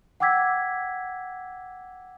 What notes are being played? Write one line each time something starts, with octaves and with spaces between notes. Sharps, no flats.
F#5 G5 D6 E6 G#6 B6